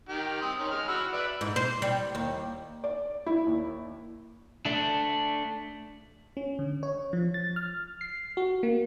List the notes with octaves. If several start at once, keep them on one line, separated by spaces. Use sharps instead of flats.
D#3 G4
C4 C6 D#6
D#3 C#4
G#3 F6
F#4 B5 E6
B4 D5 E5
G#2
C5
G3
D#2
D5
E4
D#2
A3 D4
C#4
D3
C#5
F3
A6
F6
C7
F#4
A#3